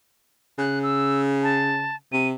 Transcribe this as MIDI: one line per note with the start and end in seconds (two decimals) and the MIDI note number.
0.59 1.96 49
0.59 0.79 90
0.83 1.21 88
1.43 1.96 81
2.12 2.34 48
2.12 2.27 99